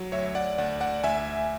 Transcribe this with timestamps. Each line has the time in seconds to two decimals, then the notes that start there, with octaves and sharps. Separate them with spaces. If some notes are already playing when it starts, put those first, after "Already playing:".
Already playing: F#3
0.12 D2 C#5 E5
0.35 D5 F#5
0.58 D2 D5 F#5
0.81 D5 F#5
1.04 D2 E5 G#5